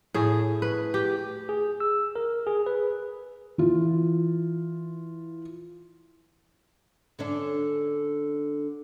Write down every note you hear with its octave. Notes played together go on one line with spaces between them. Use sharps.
A2 G#4
B4
G4
G#4
E6
A#4
G#4
B4
E3 F4
D3 C#4 D4